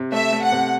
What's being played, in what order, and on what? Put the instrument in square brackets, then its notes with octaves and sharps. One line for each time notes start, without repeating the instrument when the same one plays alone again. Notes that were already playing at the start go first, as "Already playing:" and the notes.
Already playing: [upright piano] C3
[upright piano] A3 [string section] E5
[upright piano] A3
[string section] F#5
[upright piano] C3